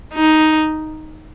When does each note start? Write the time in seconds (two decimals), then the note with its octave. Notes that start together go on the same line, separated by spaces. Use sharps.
0.14 D#4